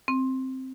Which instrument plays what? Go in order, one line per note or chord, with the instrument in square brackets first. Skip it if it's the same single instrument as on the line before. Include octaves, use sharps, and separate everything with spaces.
[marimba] C4